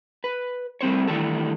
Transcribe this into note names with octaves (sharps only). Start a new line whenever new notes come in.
B4
G3 A3 C4 C5 C#5
D#3 E3 G3 A3 D4 A4